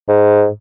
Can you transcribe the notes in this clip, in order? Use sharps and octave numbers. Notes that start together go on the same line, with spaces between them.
G#2